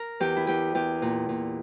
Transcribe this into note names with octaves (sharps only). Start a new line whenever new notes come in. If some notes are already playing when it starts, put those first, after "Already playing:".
Already playing: A#4
E2 G4
E4
E2 G4
E2 G4
A#2
A#2